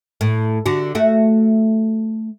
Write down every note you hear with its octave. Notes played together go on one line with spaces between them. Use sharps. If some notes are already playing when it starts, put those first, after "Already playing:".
A2
D3 F#4
A3 F#4